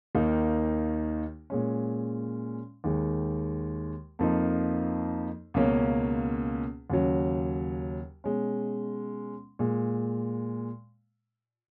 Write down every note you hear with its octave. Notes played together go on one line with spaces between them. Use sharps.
D#2 D#3 A#3 D#4
A#2 G#3 C#4
D#2 D#3 G#3
F2 F3 A#3 D#4
C#2 B2 A#3 C#4
D#2 C#3 F#3
B2 G#3 C#4
A#2 G#3